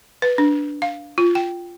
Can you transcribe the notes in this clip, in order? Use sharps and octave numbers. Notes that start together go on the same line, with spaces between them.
B4
D4
F5
F4
G5